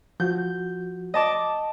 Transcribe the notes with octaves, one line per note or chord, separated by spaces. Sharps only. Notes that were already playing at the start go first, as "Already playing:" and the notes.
F3 F#4 G6
D#5 A5 D6